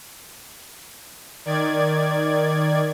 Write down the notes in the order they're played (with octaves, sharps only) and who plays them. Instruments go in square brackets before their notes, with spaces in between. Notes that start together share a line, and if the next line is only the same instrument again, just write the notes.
[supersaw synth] D#3 D5 G#6